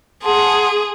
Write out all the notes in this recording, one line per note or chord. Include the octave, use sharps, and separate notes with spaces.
G#4 F#5 A5 C6